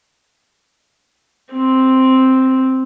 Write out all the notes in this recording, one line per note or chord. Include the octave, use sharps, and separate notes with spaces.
C4